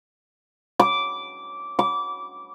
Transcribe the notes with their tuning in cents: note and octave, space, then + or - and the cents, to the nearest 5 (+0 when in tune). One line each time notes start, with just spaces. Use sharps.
D6 -10
D6 -20